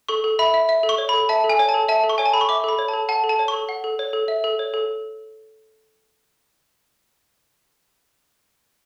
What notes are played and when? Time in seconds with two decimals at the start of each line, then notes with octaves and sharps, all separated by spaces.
0.09 A4 C#6
0.24 A4
0.39 E5 B5
0.54 E5
0.69 E5
0.83 A4
0.89 C#6
0.98 C#5
1.09 A4 B5
1.29 E5 A5
1.44 A4
1.49 G#5
1.59 C#5
1.69 A5
1.74 A4
1.88 E5 A5
2.04 A4
2.09 C#6
2.18 C#5 G#5
2.26 A5
2.33 A4 B5
2.41 C#6
2.49 E5 D6
2.64 A4 B5
2.79 C#5
2.88 A5
2.94 A4
3.09 F#5 A5
3.24 A4
3.29 A5
3.39 C#5
3.48 C#6
3.53 A4
3.69 F#5
3.84 A4
3.99 C#5
4.13 A4
4.28 E5
4.44 A4
4.59 C#5
4.74 A4